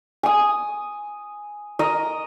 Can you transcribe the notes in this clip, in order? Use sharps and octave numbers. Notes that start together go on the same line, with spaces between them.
G#5 D#6
A#4 D#5